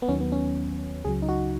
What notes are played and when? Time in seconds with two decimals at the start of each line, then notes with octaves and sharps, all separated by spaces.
0.02 B3
0.08 D#2 D#3 F#3 C#4
0.20 B3
0.32 C#4
1.04 C#2 C#3 F#3 G#4
1.22 D#4
1.29 F#4